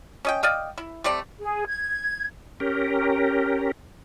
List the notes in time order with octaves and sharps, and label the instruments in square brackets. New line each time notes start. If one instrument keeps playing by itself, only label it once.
[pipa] C#4 D#5 G5
D5 D#5 F5 G5
E4
G3 A3 C4 D5
[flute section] G#4
G#6
[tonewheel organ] C#4 G4 A#4